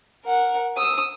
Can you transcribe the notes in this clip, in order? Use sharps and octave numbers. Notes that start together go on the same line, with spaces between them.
A#4 F#5
D#6 E6